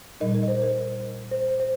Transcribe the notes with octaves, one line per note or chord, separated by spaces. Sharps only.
A#2 G3 D#4 A#4 D#5
A#4
D#5
C5
A#4
C5
C5